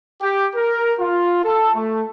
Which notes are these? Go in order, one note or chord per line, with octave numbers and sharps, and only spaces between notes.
G4
A#4
F4
A4
A3